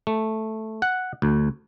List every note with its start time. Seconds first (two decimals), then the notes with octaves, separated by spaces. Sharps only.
0.07 A3
0.82 F#5
1.22 D2